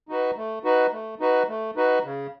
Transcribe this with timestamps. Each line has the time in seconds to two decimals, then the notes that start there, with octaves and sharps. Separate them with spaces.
0.09 D#4 F#4 B4
0.37 A3
0.64 D#4 F#4 B4
0.92 A3
1.20 D#4 F#4 B4
1.48 A3
1.76 D#4 F#4 B4
2.04 C#3